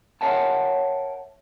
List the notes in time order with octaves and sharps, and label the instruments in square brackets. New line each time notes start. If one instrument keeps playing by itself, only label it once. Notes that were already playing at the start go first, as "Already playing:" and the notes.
[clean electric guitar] A#4 C#5 E5 F#5 G5 A5